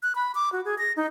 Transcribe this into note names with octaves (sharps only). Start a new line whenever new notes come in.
F#6
B5
D6
F#4
G#4
A#6
D#4